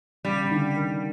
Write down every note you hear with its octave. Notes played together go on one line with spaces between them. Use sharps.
C#3 G3
C#3
D3
D#3